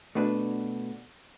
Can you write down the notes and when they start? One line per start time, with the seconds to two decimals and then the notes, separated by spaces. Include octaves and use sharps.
0.15 B2 A3 D4 F#4 B4